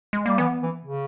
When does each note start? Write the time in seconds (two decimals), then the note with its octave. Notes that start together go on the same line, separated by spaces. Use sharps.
0.13 G#3
0.26 G3 A#3
0.38 E3 B3
0.62 E3
0.86 C#3